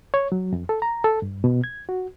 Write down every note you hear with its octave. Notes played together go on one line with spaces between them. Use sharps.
C#5
F#3
F2
A4
A#5
A4
G2
B2
G#6
F#4